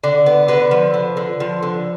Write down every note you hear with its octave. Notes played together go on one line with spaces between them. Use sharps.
D3 D5
B3
D3 B4
F3
D3
D3
F3
D3